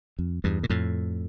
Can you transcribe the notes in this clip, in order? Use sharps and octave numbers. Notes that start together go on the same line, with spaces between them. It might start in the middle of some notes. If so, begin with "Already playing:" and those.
F2
E2 G2
A#2
F2 A2